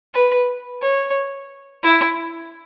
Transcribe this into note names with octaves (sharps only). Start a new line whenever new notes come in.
B4
C#5
E4